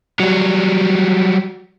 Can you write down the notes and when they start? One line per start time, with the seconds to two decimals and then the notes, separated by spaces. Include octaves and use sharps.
0.20 F#3 G3